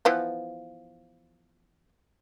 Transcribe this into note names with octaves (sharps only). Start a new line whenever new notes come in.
E3 F3 B3